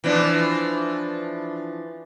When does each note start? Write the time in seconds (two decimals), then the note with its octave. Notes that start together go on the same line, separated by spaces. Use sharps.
0.04 E3 F3 D4